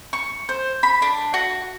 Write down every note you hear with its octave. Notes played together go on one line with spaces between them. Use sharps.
C#6
C5
B5
D4
F#4